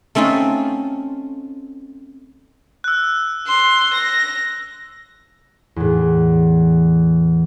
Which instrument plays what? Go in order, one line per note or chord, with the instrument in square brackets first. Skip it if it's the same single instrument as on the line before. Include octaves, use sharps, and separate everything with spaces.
[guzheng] A3 C4 C#4 D#4 F4
[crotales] E6 F#6
[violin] C6
A#6
[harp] E2 A2